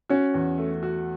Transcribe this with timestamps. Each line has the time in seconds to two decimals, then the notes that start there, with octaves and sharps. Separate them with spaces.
0.10 C#4 F#4
0.34 E2
0.58 A3
0.83 F#4